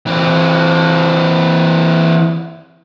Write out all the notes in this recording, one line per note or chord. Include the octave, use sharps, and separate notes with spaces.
E3 C4